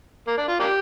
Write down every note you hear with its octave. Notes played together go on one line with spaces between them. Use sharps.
A#3
D4
F4
A#3 D4 G4